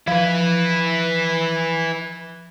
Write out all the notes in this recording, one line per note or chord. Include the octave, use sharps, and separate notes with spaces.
F3 E4 B4